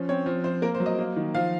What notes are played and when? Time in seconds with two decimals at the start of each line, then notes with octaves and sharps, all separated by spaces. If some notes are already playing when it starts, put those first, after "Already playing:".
Already playing: F3 C#4
0.09 C4 C#5
0.26 F3
0.44 F3 C5
0.62 A#3 A#4
0.75 C5
0.80 F#3
0.86 D#5
0.99 A#3
1.16 D#3
1.35 F3 F5